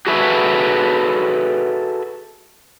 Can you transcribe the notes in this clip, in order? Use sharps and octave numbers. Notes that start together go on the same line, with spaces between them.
F#4 G#4 A4 B4 E5